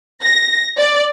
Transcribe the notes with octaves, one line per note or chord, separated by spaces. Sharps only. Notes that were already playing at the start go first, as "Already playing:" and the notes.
A#6
D5